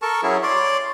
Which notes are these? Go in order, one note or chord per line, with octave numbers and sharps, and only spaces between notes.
A4 A#4 A5 C#6
F#3 C#4 E4 G#4
C#5 D5 C6 D6